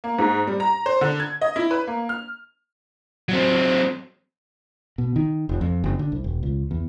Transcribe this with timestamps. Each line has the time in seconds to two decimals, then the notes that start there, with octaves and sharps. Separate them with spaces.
0.04 A#3
0.19 G#2
0.47 G3
0.60 A#5
0.86 C5
1.01 D3
1.20 G#6
1.41 D#5
1.56 E4
1.71 B4
1.87 A#3
2.09 F6
3.29 F#3 C4
4.98 B2
5.16 D#3
5.49 F1
5.61 F2
5.84 F#1
5.99 D3
6.12 C2
6.24 E1
6.43 C#2
6.71 E2